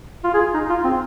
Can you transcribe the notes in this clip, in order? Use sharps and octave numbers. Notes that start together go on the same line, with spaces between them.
F4
G#4
D#4
F4
C4